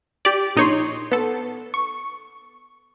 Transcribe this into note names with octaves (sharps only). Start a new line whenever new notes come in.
G4 D5
A#1 D#4 C#5 C6
B3 A4
C#6